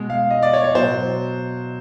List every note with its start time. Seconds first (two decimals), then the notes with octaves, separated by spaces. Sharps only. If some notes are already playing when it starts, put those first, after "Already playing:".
Already playing: B2 G#3
0.10 F5
0.31 D#5
0.42 D5
0.53 C#5
0.64 C#5
0.75 B2 F#3 C5